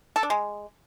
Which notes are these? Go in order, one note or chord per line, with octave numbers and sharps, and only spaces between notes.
A4
D4
G#3